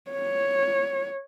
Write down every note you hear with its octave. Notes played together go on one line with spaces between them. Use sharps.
C#5